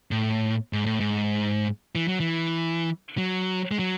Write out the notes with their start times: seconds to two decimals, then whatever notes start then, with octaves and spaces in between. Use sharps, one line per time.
0.11 A2
0.73 G#2
0.86 A2
1.00 G#2
1.95 E3
2.08 F#3
2.20 E3
3.18 F#3
3.71 G#3
3.79 F#3